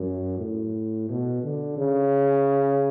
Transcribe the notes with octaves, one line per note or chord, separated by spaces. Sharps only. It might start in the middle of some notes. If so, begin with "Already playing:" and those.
Already playing: F#2
A2
B2
D3
C#3